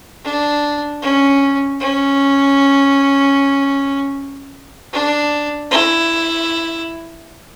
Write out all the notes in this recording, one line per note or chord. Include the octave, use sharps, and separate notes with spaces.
D4
C#4
C#4
D4
E4